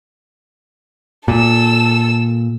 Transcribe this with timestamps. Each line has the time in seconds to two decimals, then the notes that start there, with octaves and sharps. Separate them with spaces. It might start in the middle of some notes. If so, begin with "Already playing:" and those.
1.28 A#2 A4 E6